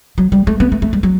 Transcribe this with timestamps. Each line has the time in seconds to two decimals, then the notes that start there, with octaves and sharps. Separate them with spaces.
0.18 F#3
0.32 G3
0.47 A3
0.60 B3
0.72 A3
0.82 A3
0.93 G3
1.03 F#3